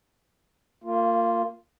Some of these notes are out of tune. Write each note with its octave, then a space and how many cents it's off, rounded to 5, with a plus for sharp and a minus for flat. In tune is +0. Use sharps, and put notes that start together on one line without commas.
A#3 -25 F4 +0